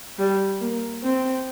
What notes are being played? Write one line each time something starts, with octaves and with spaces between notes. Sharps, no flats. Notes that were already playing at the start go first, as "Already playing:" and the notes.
G3
A#3
C4